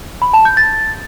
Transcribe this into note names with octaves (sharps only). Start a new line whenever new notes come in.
B5
A5
G6
A6